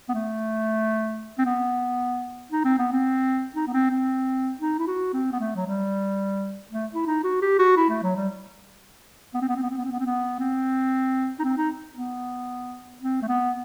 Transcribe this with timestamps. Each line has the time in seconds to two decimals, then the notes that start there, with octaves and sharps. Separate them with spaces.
0.09 B3
0.14 A3
1.39 C4
1.46 B3
2.51 D#4
2.65 C4
2.79 B3
2.92 C4
3.56 D#4
3.68 B3
3.73 C4
3.91 C4
4.61 D#4
4.79 E4
4.87 F#4
5.13 C4
5.32 B3
5.40 A3
5.56 F#3
5.66 G3
6.72 A3
6.94 E4
7.06 D#4
7.24 F#4
7.42 G4
7.59 F#4
7.77 E4
7.90 A3
8.03 F#3
8.16 G3
9.34 B3
9.41 C4
9.49 B3
9.56 C4
9.63 B3
9.70 C4
9.78 B3
9.85 C4
9.92 B3
9.99 C4
10.06 B3
10.40 C4
11.39 D#4
11.44 C4
11.58 D#4
11.97 B3
13.02 C4
13.22 A3
13.28 B3